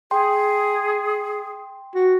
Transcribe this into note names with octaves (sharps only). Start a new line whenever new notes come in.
G#4 G5 C6
F#4